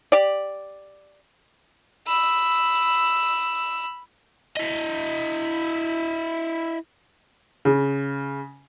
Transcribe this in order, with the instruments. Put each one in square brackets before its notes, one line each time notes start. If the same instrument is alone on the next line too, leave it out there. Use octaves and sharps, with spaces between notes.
[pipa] G4 D5
[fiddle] B5 E6
[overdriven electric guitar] E4 D#5
[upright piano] C#3